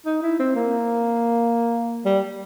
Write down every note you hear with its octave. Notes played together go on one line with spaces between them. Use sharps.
D#4
E4
C4
A#3
G3